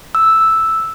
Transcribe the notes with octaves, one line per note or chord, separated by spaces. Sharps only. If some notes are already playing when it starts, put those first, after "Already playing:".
E6